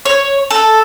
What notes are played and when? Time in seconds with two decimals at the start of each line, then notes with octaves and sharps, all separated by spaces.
0.05 C#5
0.50 A4